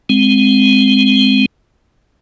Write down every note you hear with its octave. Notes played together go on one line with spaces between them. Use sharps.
G#3 C4